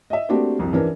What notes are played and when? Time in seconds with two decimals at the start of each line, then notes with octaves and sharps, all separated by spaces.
0.10 D#5 E5
0.29 A3 A#3 C4 D4 F#4 G4
0.59 C2 F2
0.73 E3 C#4 D4 A#4